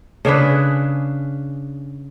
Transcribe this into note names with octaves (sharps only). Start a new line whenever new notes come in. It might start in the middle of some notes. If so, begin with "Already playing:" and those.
C#3 D4 G#4 B4